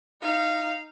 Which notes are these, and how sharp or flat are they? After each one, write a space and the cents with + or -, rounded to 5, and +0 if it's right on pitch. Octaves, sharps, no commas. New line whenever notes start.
D#4 +0 F5 -20